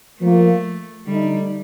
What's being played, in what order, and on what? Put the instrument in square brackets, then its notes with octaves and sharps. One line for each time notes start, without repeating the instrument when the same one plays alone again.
[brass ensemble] F3 A#3 F4 [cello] A3
[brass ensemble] D3 A3 D#4 [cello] G3